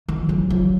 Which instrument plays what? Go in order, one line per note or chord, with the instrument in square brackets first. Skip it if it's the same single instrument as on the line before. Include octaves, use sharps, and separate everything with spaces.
[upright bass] D#3 [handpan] F3
[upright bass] E3 [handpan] F#3
[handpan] G3
[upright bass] F3
[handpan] F#3